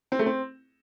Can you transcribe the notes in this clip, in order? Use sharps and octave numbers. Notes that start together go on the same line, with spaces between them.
C4
A3
C4